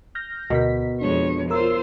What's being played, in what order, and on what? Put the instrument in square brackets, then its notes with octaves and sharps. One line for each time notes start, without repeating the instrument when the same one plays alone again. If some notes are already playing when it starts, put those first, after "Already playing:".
[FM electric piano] F6 G6 A#6
[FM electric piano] D2 A#4 B6 [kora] B2
[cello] F2 C#5 [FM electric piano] G#3 D4
[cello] F4 C5 [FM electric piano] A#4 C#5 E6